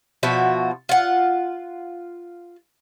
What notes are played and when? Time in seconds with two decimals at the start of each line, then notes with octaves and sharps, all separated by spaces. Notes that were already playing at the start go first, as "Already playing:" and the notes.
0.23 B2 F3 F#4 E5
0.89 F4 F#5